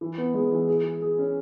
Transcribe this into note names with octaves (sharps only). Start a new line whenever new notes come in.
E3
B3
G#3
E3
G#4
G#4
G#4
C#4